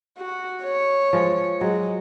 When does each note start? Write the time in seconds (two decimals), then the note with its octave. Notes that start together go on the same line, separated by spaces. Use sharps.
0.18 F#4
0.63 C#5
1.13 F3 G#3
1.61 F#3 G#3